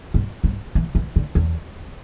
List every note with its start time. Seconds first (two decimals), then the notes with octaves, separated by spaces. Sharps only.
0.14 G2
0.44 G2
0.75 E3
0.95 E3
1.16 D3
1.35 E2